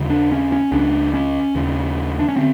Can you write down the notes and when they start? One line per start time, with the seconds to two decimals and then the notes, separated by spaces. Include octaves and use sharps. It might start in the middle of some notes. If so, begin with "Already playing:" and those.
Already playing: D#2 C#3
0.10 D4
0.32 C#4
0.52 C#4
0.72 C#2 C#3 D4
1.14 C#4
1.55 D#2 C#3
2.19 D4
2.29 C#4
2.37 D3 C4